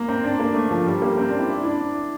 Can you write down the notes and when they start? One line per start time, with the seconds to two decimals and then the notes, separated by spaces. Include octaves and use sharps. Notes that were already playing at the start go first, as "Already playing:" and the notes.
Already playing: A#3
0.09 C4
0.24 D4
0.40 A#3
0.55 A3
0.71 F3
0.87 G3
1.02 A#3
1.18 C4
1.28 D4
1.39 E4
1.50 E4
1.65 D4